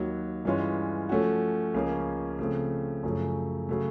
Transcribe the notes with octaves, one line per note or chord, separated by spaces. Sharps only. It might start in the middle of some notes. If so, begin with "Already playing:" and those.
Already playing: D#2 D#3 F#3
G2 E3 G#3 C#4 F4
F3 A3 C#4 F#4
C#2 C#3 F3 A#3 C#4
C#3 F3 A3 C4
F#2 C#3 F3 A3
C#3 F#3 A3